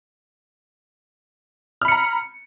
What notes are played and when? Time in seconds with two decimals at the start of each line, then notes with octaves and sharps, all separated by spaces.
1.82 F6
1.85 B5
1.88 C#7
1.92 A#5